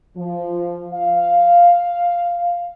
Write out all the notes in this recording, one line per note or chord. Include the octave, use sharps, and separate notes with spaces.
F3
F5